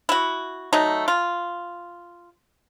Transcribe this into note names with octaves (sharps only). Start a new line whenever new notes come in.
E4 F#4
F#3 A3 D#4
F4